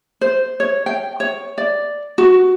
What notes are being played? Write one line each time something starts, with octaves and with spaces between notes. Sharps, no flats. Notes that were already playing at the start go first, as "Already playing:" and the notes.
C5
C#5
G5
C#5
D5
F#4